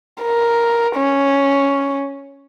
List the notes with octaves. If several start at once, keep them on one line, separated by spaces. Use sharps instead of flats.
A#4
C#4